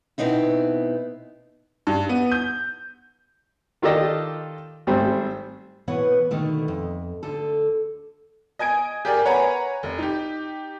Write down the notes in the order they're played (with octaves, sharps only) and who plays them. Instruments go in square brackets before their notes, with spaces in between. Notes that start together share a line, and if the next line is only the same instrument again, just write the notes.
[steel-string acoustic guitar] B2 B3 C4 D#4 E4
[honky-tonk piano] G2
B3
G6
[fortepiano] D#3 F4 G4 A4 D5 D#5
G#1 G3 A3 C4 C5
[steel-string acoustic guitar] B2 E3 B3 B4 C#5 F#5
B2 D3 D#3 A3
F2
D2 D3 A4
[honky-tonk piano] D#5 G#5 G#6 D7
G4 G#4 A#4 D5
B4 C#5 F#5 G#5 A#5 B5
F1
D#4 G4